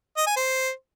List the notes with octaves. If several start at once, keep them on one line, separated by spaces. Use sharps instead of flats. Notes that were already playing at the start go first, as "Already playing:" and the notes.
D#5
G#5
C5